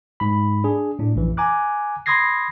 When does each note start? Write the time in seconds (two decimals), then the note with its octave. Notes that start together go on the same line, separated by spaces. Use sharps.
0.20 G#2 B5
0.64 D4 G#4
0.99 A2 D4
1.16 A#1 F#2 E3
1.37 G#5 A#5 D6 F#6
2.06 B5 C6 D#6 G#6 A#6 C7